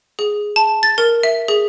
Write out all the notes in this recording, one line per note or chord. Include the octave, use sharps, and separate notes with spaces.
G#4
A5
A6
A#4
E5
G#4